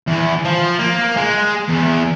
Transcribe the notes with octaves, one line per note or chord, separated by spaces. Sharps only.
E2
F3
A#3
G#3
E2